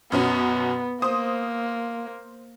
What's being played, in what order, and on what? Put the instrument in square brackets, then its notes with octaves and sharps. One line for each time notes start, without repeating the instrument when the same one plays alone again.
[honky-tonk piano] F#2 B2 C#4 [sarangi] B3
[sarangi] A#3 [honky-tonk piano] C5 D#6